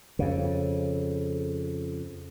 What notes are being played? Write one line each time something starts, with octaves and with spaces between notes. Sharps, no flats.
F2 C#3